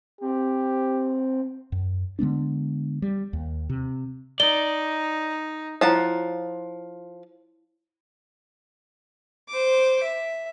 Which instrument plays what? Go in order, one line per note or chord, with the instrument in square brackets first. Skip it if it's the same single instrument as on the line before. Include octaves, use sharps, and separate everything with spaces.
[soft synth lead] C4 [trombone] G4
[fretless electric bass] F#2
D3 G#3 B3 D4
G3
D#2
C3
[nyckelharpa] D#4 [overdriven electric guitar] D5 [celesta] G7
[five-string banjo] F3 F4 F#5 [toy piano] E4 C#5
[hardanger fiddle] C5 D6
E5